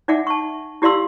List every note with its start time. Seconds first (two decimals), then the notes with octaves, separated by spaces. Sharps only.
0.08 D#4 D5 E5 F#5 G#5 D6
0.27 A5 C#6
0.82 E4 G4 D5 F5 C6 E6